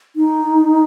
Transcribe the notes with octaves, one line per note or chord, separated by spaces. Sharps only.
D#4